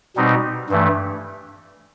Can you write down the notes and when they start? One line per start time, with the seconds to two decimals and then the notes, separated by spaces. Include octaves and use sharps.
0.16 B2 G3 C4 D#4
0.69 G2 E3 A3